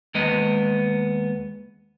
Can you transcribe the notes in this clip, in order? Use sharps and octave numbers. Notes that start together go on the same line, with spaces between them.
D#2 G#3 B3 D#5